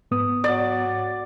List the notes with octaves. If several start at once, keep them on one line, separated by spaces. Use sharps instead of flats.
G#2 B3 D#6
F#3 D5